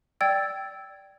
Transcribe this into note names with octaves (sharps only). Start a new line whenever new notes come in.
D5 G5 E6 G#6 A6